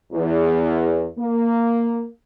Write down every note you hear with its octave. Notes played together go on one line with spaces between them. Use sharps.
E2
A#3